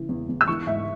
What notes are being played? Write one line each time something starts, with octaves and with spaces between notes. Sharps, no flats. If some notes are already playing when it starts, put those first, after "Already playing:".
Already playing: C#3 E3
E2
E2
E6
E3 C#6
G#2 E5